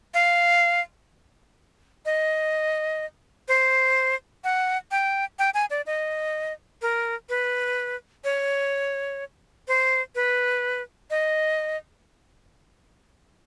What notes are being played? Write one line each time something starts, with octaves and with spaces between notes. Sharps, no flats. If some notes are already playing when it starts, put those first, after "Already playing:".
F5
D#5
C5
F#5
G5
G5
G#5
D5
D#5
A#4
B4
C#5
C5
B4
D#5